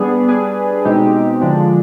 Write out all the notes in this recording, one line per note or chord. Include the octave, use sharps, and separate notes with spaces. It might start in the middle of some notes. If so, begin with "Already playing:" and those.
Already playing: G3 B3 D4 G#4
G3 D4 G#4 B4
B2 G#3 C4 D#4 G4
D3 F3 G#3 D4